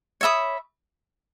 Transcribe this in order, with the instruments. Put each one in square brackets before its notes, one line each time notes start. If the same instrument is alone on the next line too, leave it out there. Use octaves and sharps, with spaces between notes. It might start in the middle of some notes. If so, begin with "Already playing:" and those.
[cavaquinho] C#5 E5 B5 D#6